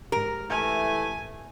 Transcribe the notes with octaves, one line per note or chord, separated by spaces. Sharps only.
G#2 G4 A#4
E3 A3 G#5